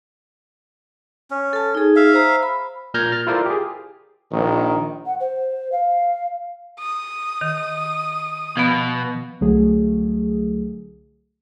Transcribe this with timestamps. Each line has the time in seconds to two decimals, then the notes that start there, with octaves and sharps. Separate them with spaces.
1.31 C#4
1.53 A4 A5
1.75 D#4 G#4
1.96 E5 F5
2.14 C5 A#5
2.43 B5
2.94 A#2 A#4 F6 G6 G#6 A#6
3.12 F6 A6
3.27 E4 F4 A4 A#4 C5 D5
3.46 G4 G#4
4.32 A#1 D#3
5.06 F#5
5.20 C5
5.72 F5
6.79 D#6
7.41 D#3
8.57 B2 F3 B3
9.41 C2 D3 F#3 A3 G#4